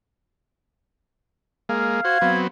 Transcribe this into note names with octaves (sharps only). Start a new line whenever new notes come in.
G#3 A#3 F5
F#4 C5 G#6
F#3 B3 C4